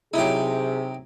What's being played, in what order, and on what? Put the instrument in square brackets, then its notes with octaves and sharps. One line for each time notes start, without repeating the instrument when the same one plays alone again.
[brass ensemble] C3 [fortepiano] F#3 E4 [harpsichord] D#4 G4 [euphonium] G#4